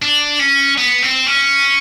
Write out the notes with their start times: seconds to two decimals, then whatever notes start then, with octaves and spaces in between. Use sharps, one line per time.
0.02 D4
0.39 C#4
0.78 B3
1.02 C4
1.27 C#4